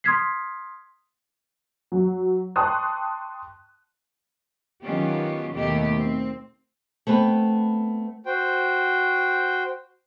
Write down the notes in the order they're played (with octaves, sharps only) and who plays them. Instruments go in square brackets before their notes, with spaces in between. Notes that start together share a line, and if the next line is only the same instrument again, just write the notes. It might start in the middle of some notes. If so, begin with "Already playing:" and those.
[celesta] C6 D#6 F6 G#6 B6 C7
[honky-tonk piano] F#3
G5 A5 C6 C#6 D#6 F#6
[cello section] D#3 F#3 B3 C#4 F4 G4
D#2 B2 D#3 A3 A#3 G4
C4
[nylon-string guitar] A3 B3 C4 B4
[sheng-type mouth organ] F#4 C5 G5